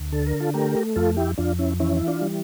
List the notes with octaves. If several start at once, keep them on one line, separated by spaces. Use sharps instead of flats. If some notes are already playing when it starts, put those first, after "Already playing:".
Already playing: D2
D3 A4
A#4
F4 A4
A3 G4 A#4
F2 F4 A4
E4 G4
F2 D4 F4
C#4 E4
E3 C#4 E4
E4
D4 F4
G3